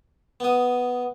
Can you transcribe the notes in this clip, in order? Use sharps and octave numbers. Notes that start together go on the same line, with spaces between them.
B3 D#6